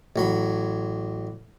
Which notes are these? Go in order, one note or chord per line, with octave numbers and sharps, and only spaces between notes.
A1 F#3 B5